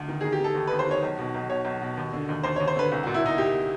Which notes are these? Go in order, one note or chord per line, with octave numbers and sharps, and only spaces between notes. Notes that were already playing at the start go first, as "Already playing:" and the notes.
Already playing: D2
D#3
G#4
D#3
G4
D#3 A4
D#2
B4
D#2
C5
D#3 C#5
B1
B2
B1
B2 C#5
B1
B2
D#2
D3
D#2
D#2 C5
C#5
D#2
C5
D3 B4
C2
F#4
A#2
E4
A#2 D#4
A#2 G4